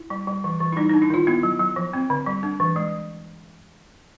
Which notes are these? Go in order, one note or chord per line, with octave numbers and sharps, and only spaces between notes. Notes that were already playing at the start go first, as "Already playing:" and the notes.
Already playing: E4
G3
G3
E3
E3
E4
G3 D#4
D4 D#4
E4
D#3 F4
B3 E4
F#3
F#3
F3
C4
D3
G3
D4
E3
G#3